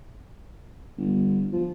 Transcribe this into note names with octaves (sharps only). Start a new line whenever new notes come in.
G1
F3